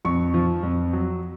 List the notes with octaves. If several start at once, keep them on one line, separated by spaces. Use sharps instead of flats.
F2 C#6
F3
F2
F#3